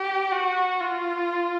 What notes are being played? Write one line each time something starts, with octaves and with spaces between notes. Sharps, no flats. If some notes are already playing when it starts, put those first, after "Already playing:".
Already playing: G4
F#4
F4